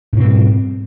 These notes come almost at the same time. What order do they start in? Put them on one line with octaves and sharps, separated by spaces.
G#2 B2 C4 G3